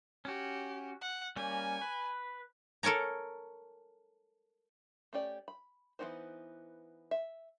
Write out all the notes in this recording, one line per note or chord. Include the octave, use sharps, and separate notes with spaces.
C#4 F#4 G4
F#5
G3 A#3 C#4 G#5
B4
A4 A#4 C#5 G#5 A#5
A3 C#4 G4 D5
B5
E3 B3 C4 D#4 C5
E5